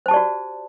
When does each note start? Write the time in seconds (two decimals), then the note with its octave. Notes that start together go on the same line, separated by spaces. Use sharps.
0.06 C5
0.08 A5
0.11 G4
0.14 D5
0.16 F#4